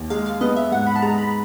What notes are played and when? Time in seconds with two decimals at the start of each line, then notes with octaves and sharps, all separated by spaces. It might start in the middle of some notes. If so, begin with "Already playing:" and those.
Already playing: D#2
0.10 G#3 F5
0.26 F5
0.41 B3 D#5
0.56 E5
0.71 G#2 F#5
0.87 B5
0.96 A5
1.02 G#3 A#5
1.18 B5